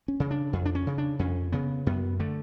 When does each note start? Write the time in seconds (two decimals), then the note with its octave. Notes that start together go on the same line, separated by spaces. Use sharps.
0.08 C#4
0.20 C#3
0.31 D4
0.53 F2
0.66 D4
0.75 C#4
0.87 C#3
0.98 D4
1.19 F2 C#4
1.52 C#3 B3
1.86 F#2 B3
2.20 D3 A3